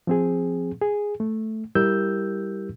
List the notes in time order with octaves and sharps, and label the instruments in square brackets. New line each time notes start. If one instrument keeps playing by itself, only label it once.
[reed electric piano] F3 C4 G#4
G#4
A3
G3 E4 G4 A#4 E6 G6